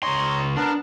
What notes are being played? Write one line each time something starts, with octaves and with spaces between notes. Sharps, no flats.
C#2 D#4 C#5 D#5 C6
B3 D4 A#4